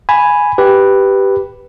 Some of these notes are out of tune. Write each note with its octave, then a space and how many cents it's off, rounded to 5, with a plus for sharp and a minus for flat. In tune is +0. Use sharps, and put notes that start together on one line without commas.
G#5 +0 B5 +0
G4 -5 B4 +0